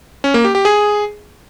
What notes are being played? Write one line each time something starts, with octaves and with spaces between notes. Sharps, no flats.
C#4
A#3
G4
G4
G#4